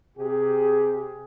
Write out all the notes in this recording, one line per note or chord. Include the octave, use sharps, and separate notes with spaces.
C3 G4 G#4